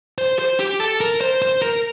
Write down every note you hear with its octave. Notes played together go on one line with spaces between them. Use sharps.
C5
C5
G4
A4
A#4
C5
C5
A#4